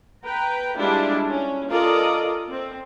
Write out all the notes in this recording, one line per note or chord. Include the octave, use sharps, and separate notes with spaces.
B4 G5 A#5
G3 G#3 D4 E4 F4
C#4
F4 A4 A#4 D5 D#5
C4